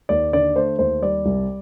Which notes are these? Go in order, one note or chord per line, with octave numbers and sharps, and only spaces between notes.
D#2 D5
D3 D5
A3 C5
D#2 C5
G3 D5
C2